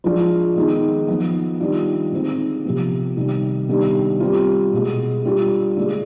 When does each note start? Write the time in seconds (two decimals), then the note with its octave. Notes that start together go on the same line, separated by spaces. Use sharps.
0.04 F3 G#3 D4 F4
0.56 D#3 G#3 B3 D#4
1.08 F3 B3 D#4
1.60 D#3 G3 D4 F4
2.12 D3 G#3 C4 D#4
2.65 C3 F3 B3
3.17 C3 D#3 G3
3.69 C3 D#3 G3 B3 D4
4.20 G3 C4 F4
4.73 B2 G#3 B3
5.25 G3 D4 F4
5.76 D3 G#3 D4